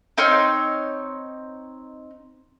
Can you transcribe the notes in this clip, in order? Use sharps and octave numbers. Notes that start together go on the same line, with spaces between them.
C4 D#4 C#5 F6